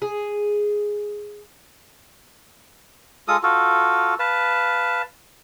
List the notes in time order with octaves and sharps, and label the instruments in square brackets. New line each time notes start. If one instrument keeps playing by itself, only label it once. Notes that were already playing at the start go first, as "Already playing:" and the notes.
[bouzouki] G#4
[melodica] G#3 F4 A4 D#6
F4 F#4 A4
B4 F5 A5